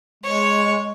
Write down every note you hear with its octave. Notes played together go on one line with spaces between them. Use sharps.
G#3 C#5